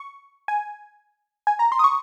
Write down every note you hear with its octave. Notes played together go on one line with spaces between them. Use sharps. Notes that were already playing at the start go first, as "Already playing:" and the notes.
Already playing: C#6
G#5
G#5
A#5
C6
D#6
C#6